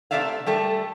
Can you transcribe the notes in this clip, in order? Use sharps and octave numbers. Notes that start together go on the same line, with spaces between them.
C3 G3 A3 D5 E5 F5
G3 A3 A4